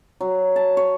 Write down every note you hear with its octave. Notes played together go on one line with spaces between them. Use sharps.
F#3
A5
C#5